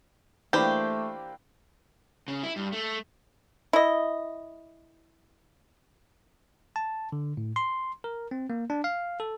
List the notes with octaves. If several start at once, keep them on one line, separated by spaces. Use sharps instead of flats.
E3 A3 A#3 D4 G4 C5 G5 B5
C#3
E4
G2
A3
E4 D#5
A5
D3
A2
C6
A#4
C4
A#3
D4
F5
A4